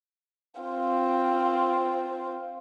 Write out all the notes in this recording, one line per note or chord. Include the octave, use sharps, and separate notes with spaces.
C4 F4